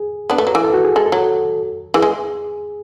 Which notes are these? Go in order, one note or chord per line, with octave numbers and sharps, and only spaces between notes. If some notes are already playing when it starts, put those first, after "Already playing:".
Already playing: G#4
B3 D4 B4
A3
F#3
E3
A4
F#4
G#4
G#3 A4
A4
F#3 F#4
E3 G#4
G#3